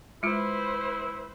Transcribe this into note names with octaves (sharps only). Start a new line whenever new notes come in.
G#3 E4 F4 B4 C5